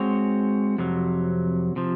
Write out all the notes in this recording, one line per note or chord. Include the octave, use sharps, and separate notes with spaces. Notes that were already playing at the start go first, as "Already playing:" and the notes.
Already playing: G#3 C4 F#4 C#5
F2 C3 F#3
C3 F3